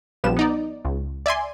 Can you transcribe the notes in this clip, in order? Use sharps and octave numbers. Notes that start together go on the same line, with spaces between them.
A#1 F3 G3 B3 E7
B3 D#4 D5
C#2
D5 E5 G#5 C6